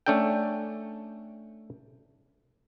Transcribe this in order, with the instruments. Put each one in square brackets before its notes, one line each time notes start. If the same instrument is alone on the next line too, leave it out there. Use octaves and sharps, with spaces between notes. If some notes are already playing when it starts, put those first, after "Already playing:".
[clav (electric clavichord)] A3 C#4 D4 A4 G5